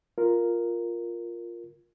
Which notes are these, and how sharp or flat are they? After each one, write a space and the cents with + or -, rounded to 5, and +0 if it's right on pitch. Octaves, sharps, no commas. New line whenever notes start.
F4 +0 A#4 +0